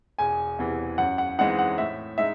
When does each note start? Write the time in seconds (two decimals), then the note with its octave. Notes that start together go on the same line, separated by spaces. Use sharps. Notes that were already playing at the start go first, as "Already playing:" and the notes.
0.19 E1 G#5
0.59 E2 C3 E3
0.98 F#2 F#5
1.18 F#5
1.38 E3 G#3 C4 D#4 F#5
1.59 F#5
1.78 A2 E5
2.18 G#3 D#4 E5